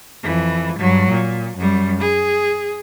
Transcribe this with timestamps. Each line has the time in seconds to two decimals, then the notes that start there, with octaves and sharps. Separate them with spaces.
0.23 F2 E3
0.78 G2 F#3
1.10 A#2
1.57 F#2 G3
2.01 G#4